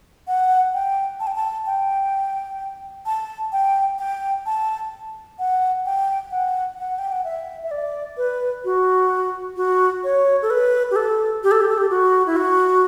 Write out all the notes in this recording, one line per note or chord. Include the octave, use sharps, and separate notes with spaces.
F#5
G5
A5
G5
A5
G5
A5
G5
G5
A5
F#5
G5
F#5
F#5
G5
F#5
E5
E5
D5
B4
F#4
F#4
C#5
A4
B4
G4
A4
G4
A4
G4
A4
G4
F#4
E4
F#4